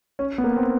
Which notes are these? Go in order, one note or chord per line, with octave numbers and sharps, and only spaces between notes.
C#4
B3
A#3
C4